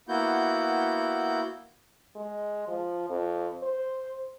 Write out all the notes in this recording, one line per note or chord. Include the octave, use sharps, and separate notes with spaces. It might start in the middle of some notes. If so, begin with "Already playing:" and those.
A#3 B3 E4 F#4 G6
G#3
F3
F2
C5